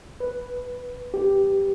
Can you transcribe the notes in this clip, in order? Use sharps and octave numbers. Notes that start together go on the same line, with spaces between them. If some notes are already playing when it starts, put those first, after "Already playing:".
B4
G4